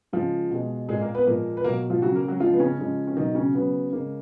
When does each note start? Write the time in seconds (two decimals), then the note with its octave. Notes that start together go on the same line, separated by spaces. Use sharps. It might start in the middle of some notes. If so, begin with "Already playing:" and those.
0.13 C#3 F3 G#3 F4
0.50 B2 G#3
0.89 A#2 G#3 G#4
1.01 A#3 A#4
1.15 B3 B4
1.26 A#2 F3 G#3 A#3 A#4
1.57 B4
1.64 B2 F#3 A#3 A#4
1.90 F3 F4
2.02 C#3 F#3 F#4
2.15 A#3 A#4
2.28 F#3 F#4
2.40 C#3 F3 G#3 F4
2.53 B3
2.60 C#3 C#4
2.79 C#3 F3 G#3
3.07 C#4
3.16 B2 D#3 F#3 D#4
3.35 C#3 C#4
3.55 C#3 F#3 B3
3.92 C#3 G#3 A#3